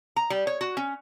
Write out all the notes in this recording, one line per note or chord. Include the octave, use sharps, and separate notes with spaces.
A#5
G3
C#5
F#4
C#4